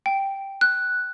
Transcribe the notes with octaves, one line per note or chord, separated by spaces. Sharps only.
G5
F#6